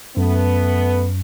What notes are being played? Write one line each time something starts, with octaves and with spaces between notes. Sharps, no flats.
F#2 A3 B3